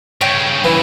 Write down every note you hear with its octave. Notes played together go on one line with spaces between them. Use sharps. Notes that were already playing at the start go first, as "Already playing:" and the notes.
G2 C#3 C#5 G5
E3